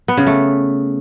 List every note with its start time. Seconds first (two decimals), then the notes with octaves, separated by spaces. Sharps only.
0.08 B3
0.17 C#3
0.27 A3